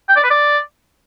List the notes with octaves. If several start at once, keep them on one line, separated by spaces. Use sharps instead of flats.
G5
D5
B4
D5